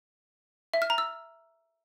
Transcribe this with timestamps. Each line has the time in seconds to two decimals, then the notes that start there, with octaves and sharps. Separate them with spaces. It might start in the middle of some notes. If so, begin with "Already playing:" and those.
0.74 E5
0.82 F6
0.90 A#5
0.98 E6